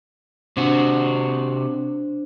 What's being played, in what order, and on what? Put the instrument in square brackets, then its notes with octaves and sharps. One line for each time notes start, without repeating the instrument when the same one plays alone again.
[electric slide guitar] C3 F#4 [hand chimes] D4 C5